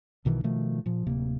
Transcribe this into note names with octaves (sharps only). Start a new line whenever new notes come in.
B1 B2 D#3 E3
B2 D#3 F3 A3
A#2 F3
D1 C3 A#3